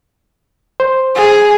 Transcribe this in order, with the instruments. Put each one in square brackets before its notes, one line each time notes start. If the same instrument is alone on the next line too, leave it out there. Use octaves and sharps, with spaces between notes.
[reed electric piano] C5
[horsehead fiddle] G#4